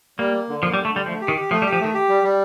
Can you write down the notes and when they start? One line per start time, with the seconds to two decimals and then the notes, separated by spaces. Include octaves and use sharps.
0.19 G3 A#3
0.33 A#3
0.49 D3
0.63 F3 A#3
0.74 G3
0.78 D3
0.85 A3
0.92 D3 G3
1.06 F3 A3
1.21 G4
1.28 D#3
1.36 G4
1.51 F3 A3
1.62 G3
1.66 G4
1.73 F3
1.80 D#3 A3
1.94 G4
2.09 G3
2.23 G3